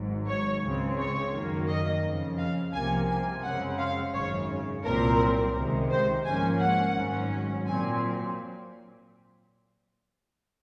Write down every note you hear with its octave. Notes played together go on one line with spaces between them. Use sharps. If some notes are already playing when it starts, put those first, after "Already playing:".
Already playing: G#1 G#2 F#3
C#5
C#2 C#3 G#3 C4
C#5
F#2 D#3 F#3 A#3
D#5
F2 C#3 F3
F5
C2 C3 F3 A#3 G#5
G#5
F#2 C#3 G#3 C4 F#5
F5
G#1 F#2 C#3 C#5
C2 A#2 F#3 C4 A#4
C#2 C3 D#3 G#3
C5
G#2 F3 A#3 C#4 G#5
F#5
G#1 G#2 F#3 C#4
A#2 F#3 C4 G#5